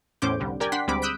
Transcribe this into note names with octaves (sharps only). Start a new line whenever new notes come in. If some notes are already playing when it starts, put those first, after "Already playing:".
E2 A2 C#4 C5 D6 G6
C2 D3 G3
G4 A#4 D5 G5 G#5
D4 F#5 G5 C6 B6
D2 G3 G#3 C4 B5 D6
D#6 E6 F#6 G6 B6 D7